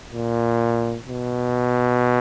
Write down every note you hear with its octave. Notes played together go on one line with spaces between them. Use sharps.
A#2
B2